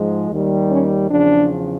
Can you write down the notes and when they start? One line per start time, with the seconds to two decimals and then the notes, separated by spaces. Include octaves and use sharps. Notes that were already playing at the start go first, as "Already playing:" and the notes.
Already playing: G#2 F3 G#3
0.31 D#2 D#3 G3
0.70 C#4
1.10 E2 C#3 F3 D4